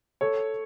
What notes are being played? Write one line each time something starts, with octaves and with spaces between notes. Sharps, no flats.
A4 C#5